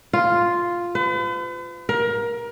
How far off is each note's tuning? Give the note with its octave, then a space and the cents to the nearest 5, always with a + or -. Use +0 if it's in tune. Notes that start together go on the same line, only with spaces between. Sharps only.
F4 +0
B4 +45
A#4 +25